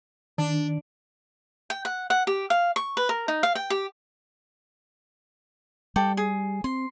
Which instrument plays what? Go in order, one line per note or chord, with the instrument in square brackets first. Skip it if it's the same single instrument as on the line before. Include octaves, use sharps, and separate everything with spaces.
[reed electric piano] D#3 [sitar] D4
[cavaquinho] G5
F#5
F#5
G4
F5
C#6
B4
A#4
D#4
F5
G5
G4
[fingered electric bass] G3 [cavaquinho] A4 D5 G5
[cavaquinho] G#4
[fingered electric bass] C4 [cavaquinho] C6